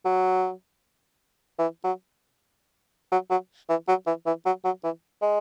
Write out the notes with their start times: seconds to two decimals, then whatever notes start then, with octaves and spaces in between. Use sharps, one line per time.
0.05 F#3
1.59 E3
1.84 F#3
3.12 F#3
3.30 F#3
3.69 E3
3.88 F#3
4.07 E3
4.26 E3
4.45 F#3
4.64 F#3
4.84 E3
5.22 G#3